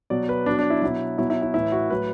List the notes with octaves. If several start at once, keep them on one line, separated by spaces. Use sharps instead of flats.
B2 F#3 D5
B4
B2 F#3 D4
D4
E4
B2 F#3 E4
B2 F#3 E4
E4
E4
A2 E3 E4
F#4
A2 F#3 B4